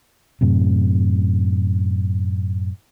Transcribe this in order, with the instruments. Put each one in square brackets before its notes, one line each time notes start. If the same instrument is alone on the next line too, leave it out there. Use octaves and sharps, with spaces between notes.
[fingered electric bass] F#2 A2 C3